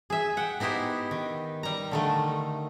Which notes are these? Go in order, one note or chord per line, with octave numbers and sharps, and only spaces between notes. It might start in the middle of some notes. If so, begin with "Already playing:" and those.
G#4 E5
F#5 G5
B3 D#4 E4 G4 C5
D#3
G3 A#5
D3 D#3 A3